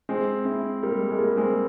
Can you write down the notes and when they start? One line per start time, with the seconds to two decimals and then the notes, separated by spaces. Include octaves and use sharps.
0.09 G#3 C4
0.45 C4 E4
0.83 G3 A#3
1.00 G#3
1.11 G#3
1.19 G3 A#3
1.37 G#3 C4